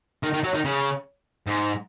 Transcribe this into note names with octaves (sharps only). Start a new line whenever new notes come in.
D#3
D#3
F#3
D#3
C#3
G#2